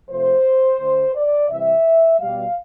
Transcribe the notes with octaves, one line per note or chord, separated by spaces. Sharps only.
C3 F3 A3 C5
D3 A3
D5
C3 E3 G3 E5
B2 G3 F5